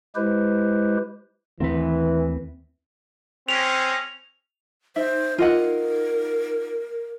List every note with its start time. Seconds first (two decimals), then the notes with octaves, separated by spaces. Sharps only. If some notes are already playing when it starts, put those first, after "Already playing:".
0.16 G#3 E4 G4 B4 C5
1.60 D#2 D#3 E3 A3 C4 B4
3.49 G#3 C4 C#4 F7
4.96 D#4 C5 E5
5.38 F4 A#4 D#5 F#5